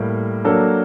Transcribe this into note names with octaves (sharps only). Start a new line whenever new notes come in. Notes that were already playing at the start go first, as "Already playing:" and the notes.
Already playing: A2 G3 A#3
F#3 A#3 D4 A4